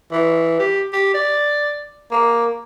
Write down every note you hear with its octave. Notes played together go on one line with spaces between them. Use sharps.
E3
G4
G4
D5
A#3